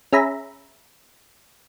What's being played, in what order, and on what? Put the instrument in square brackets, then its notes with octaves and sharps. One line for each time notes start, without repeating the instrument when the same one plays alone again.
[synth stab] C#4 G#4 E5 A#5 B5